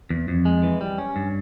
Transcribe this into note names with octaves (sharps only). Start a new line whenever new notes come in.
E2
F2
G#3
E3
G3
C#4
G2